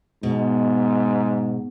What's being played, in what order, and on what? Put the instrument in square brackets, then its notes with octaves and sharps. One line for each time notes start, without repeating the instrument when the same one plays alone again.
[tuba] G#2 [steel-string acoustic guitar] B2